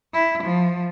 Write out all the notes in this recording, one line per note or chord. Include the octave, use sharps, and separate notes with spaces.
E4
F3